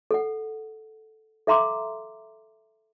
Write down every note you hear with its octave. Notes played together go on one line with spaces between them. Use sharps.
A4 F#5
A4 E5 F5 A#5 C6 D6